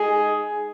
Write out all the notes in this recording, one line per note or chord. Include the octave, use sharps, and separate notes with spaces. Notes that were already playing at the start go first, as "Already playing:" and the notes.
Already playing: G#3 D#4 G#4